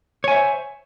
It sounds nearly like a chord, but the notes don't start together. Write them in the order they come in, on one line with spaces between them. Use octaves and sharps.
C#5 G#5 E5 C5